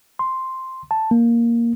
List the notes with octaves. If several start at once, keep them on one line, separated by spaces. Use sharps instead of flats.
C6
A5
A#3